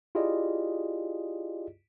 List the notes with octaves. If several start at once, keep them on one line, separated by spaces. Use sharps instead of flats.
E4 F4 G4 G#4 D5 D#5